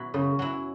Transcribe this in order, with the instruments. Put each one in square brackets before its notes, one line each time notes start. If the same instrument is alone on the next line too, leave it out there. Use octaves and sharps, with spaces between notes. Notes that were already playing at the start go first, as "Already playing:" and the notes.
Already playing: [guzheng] B2 F#3 B3 E4
[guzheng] F#2 [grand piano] C#3
[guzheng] F#3 E4